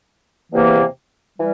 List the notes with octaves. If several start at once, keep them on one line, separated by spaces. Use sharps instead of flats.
E2 C3 E3 A#3
E3 G3